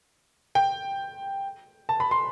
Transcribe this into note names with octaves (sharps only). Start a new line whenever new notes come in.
G5
A5
B5
C6